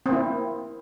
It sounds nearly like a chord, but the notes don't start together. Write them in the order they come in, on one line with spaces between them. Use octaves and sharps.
C4 A#3 E4